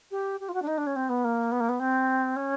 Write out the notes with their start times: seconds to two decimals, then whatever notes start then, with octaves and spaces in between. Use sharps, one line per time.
0.11 G4
0.40 G4
0.49 F4
0.54 F#4
0.62 D4
0.67 D#4
0.78 D4
0.87 C#4
0.96 C4
1.09 B3
1.24 A#3
1.52 B3
1.60 A#3
1.69 B3
1.80 C4
2.36 C#4